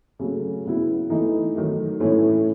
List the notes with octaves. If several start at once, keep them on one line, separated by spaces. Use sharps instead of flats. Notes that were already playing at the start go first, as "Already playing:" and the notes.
C#3 F#3 A3
C#3 F#3 B3 E4
E3 A3 D#4
D#3 F#3 A3
A2 E3 A3 C#4 E4